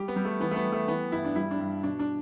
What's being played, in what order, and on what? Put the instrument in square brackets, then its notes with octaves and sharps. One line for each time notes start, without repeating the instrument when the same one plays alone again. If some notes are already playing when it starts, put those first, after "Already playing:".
Already playing: [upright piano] G3 G4
B3
G3
A3
E3 B3
A3
B3
G3
A3
E3 B3
G2 E4
D4
G3 E4
D4
G2
B2 D4
D4